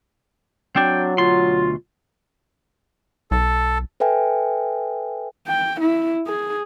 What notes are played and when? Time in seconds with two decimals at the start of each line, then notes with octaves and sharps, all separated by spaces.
0.76 F#3 C4 D4 G5
1.18 D2 B2 F4 C6
3.31 B1 A4
4.00 A4 B4 E5 G5 G#5
5.47 G5
5.81 E4
6.27 G#4